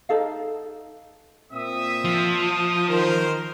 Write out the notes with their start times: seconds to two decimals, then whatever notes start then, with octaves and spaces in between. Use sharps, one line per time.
0.09 D#4 A4 F5
1.53 A#2 C4 E5 D#6
2.04 F3
2.89 D#3 A#4 C5